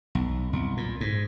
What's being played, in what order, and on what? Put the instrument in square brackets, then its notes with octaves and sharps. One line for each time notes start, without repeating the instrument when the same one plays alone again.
[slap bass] B1
C2
A#2
G#2